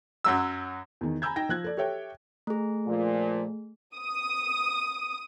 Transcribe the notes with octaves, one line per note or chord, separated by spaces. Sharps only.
F#2 F#3 E6
E2 D#3
G#5 A#5 B5 E6 G6 G#6
D#4 G5 A#6
F3 F#6 G#6
A4 D5
G4 A4 C#5 E5 G5
A3 G#4
A#2 F3
D#6